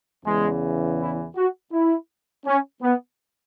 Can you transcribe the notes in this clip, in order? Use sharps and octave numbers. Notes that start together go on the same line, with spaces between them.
E2 C#3 E3 G#3
E4
F#4
E4
C#4
B3